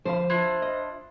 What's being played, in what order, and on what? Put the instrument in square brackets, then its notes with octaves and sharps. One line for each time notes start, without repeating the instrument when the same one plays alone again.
[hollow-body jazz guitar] F3 B4 F5 [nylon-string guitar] C5
[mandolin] D4 E4 F4
[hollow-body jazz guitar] D#5